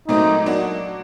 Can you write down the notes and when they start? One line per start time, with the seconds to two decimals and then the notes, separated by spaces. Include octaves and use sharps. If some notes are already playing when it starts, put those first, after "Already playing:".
0.08 A#2 F#3 A3 C4 D#4
0.46 F#3 A#3 D4 F#4